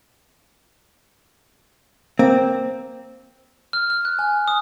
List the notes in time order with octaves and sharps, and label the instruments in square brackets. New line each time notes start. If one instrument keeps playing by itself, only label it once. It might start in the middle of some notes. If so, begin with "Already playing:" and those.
[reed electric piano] A#3 [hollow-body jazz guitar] C4
[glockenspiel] F6
F6
F#6
G#5
D#6